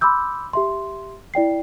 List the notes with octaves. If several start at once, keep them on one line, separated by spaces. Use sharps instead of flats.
B5 C6 D6 E6 G6
G4 E5 C6
E4 D5 G5 C7